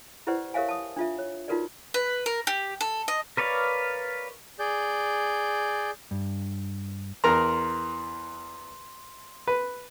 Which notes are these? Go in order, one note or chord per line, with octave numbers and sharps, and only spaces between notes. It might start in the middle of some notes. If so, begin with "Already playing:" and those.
E4 G4 B4 C5 D5 F#5
G4 A#4 C#5 E5 F5 G#5
A5 D#6
D4 F4 E5
C#5
D#4 F4 F#4 A#4 B4 D5
B4
A#4
G4
A4
D#5
A#4 B4 C#5 D5 F5
G#4 D5 G6
G2
E2 A#4 A#5 C6
B4